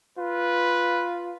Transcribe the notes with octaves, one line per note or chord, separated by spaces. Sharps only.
F4 B4